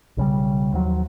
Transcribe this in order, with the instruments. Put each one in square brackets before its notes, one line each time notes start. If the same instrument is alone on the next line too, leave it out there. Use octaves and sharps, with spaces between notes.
[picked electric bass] B1 C#3 G3
D#2 F3 F#3